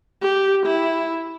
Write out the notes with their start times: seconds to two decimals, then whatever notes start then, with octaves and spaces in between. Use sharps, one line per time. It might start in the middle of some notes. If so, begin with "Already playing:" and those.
0.22 G4
0.66 E4